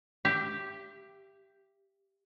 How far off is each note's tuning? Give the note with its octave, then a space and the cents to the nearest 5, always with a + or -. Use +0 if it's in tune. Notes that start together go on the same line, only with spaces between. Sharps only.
G4 +0 E5 +35